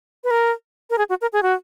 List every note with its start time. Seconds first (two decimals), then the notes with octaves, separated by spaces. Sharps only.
0.24 B4
0.31 A#4
0.90 A#4
0.98 G#4
1.09 F#4
1.21 A#4
1.33 G#4
1.43 F#4